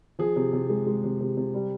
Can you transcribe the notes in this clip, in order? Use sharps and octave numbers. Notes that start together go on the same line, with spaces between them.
F3 G#4
C3
C3
G#3
G#3
C3
C3
C3
G3